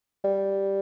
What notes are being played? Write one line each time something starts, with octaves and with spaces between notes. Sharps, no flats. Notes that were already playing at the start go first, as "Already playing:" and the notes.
G3